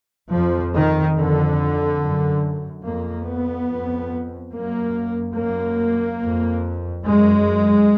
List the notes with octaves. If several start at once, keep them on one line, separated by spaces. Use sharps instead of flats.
F2 F3
D#3
F2 D3
F#2
F2 A#3
B3
F2
F#2 A#3
F#2 A#3
F2
F#2 G#3